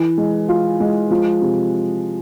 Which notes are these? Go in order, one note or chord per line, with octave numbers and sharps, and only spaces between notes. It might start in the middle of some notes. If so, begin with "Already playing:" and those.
Already playing: E3
G#3
F4
G#3
F3
C3